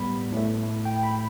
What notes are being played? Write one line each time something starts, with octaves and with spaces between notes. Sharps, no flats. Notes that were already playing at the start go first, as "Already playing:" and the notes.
Already playing: A2 G3 B3 B5
A2 A3
G5
B5